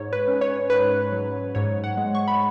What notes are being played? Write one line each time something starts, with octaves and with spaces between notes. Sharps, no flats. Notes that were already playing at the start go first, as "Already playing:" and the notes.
Already playing: G#2 C#5
B4
C#4
C#5
G#2 B4
F#3
G#2 C#5
F#5
G#3
C#6
B5